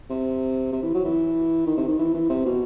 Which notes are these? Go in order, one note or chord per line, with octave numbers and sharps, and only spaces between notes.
C3
C3
E3
F#3
E3
D#3
C3
D#3
E3
E3
C3
B2